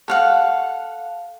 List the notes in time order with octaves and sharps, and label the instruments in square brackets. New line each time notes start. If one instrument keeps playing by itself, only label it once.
[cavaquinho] A4 F5 F#5